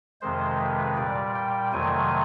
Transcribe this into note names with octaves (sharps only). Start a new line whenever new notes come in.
F2 C3 D#3 G#3 C5
B4
A#2 G3 D5
G5
F2 C3 D#3 F#3 A3 G#5